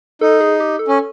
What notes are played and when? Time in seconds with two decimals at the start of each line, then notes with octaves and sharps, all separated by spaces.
0.21 D#4 A4
0.41 G#4
0.60 G4
0.79 A4
0.88 C#4